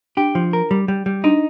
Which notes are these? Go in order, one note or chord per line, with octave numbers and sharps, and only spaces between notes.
D4 G4
F3
A#4
G3
G3
G3
D4 D#4